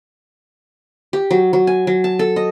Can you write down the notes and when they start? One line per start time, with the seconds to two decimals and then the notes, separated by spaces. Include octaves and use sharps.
1.13 G4
1.31 F#3
1.53 F#3
1.67 G#5
1.87 F#3
2.04 A5
2.19 A4
2.36 D#5